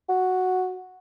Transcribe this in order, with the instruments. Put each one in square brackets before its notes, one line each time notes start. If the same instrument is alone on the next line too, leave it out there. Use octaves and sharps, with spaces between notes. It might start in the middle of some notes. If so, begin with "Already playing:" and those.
[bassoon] F#4